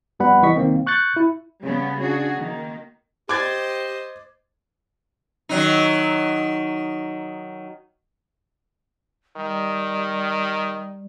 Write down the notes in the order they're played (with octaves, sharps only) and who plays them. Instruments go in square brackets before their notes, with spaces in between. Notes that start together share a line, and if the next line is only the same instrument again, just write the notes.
[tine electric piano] G1 F2 G3 B3 F#5 B5
C2 E3 D#5 C#6 B6
C2 D#3 A#3 C4
C#6 F#6 G6 A6 C#7
E4
[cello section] C#3 G3 B3 C#4
D4 F#4 G#4
D#3 A#3
[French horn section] G4 [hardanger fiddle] C5 D#5 [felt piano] D6 G#6 A6
[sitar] D#3 F#3 D#4
[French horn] D#3 [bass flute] G3